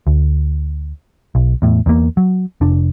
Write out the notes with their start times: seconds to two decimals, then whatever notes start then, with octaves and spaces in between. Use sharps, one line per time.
0.07 D2
1.35 B1
1.62 E2 A2
1.86 E2 D3 A#3
2.17 F#3
2.61 F1 D4